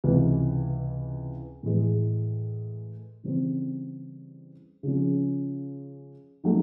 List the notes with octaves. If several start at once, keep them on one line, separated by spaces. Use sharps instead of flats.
C#2 C3 E3
A2 E3 G#3
C#3 E3 G3 C4
C#3 F3 G#3 C#4
D#3 F#3 A3 C#4